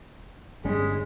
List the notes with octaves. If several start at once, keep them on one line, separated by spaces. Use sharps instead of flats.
G1 G3 G#3 C#4